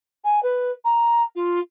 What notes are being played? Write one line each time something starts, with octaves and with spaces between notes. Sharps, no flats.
G#5
B4
A#5
F4